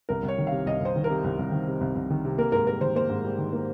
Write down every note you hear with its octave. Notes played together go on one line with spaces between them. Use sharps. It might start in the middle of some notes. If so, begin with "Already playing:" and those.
C2 A#4
C2
C#5
D#3
C3 F5
C2 D#5
C2 C5
D#3
A#4
C3
C2
C2
D#3
C3
C2
C2
D#3
C3
A#3 A#4
G#2 A#4
G3 A#4
D#3 C5
A#3 C5
G#2
G3
D#3
A#3